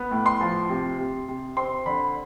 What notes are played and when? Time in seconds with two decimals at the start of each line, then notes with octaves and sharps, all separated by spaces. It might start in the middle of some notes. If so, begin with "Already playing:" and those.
Already playing: B3
0.11 A2
0.26 C6
0.41 F3
0.69 C3
0.99 C3
1.29 C3
1.57 C4 C6
1.86 D3 B5